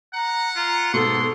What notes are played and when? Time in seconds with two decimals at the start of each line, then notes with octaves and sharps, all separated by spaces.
0.14 F#5 A#5
0.56 F4 A#5
0.94 G#2 B2 A4 C6